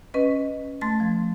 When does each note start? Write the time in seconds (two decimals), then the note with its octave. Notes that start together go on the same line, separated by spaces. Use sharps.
0.14 C#4 B4 D#5
0.81 A3 A5 C6 A6
1.00 F3